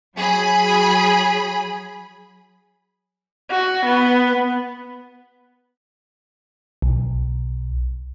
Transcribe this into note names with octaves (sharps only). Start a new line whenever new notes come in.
F#3 G#4 B5
F#4
B3
B1